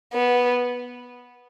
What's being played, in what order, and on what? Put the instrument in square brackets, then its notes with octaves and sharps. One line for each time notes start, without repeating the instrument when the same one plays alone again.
[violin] B3